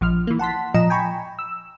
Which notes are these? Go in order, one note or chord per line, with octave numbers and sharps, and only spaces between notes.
A#1 F3 F6
E3 A#3
F#5 A5 C6 B6
A#2 F3 D#5 A#5 E7
G5 G#5 A#5 B5 C#6
E6